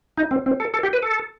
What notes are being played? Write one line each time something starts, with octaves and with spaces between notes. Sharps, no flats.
D#4
C4
C4
A4
A4
G4
B4
A4